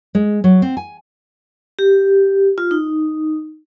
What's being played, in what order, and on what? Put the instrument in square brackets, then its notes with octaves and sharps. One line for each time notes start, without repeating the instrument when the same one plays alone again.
[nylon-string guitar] G#3
F#3
C4
G#5
[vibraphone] G4
F4
D#4